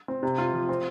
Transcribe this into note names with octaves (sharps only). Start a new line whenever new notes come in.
C4
C3
F4
F3
C4